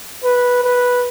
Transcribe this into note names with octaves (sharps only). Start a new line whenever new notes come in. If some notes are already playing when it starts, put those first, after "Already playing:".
B4
B4